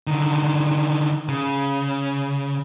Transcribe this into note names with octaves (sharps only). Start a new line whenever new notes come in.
D3 D#3
C#3